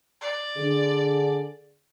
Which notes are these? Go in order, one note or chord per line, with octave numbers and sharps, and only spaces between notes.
D5
D3 G#4